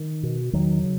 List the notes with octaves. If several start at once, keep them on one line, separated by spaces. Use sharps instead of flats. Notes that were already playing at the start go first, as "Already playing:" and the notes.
Already playing: D#3
B2
E2 D#3 F#3
C#3